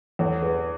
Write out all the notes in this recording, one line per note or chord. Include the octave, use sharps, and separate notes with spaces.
E2 A4 C#5
G#4 B4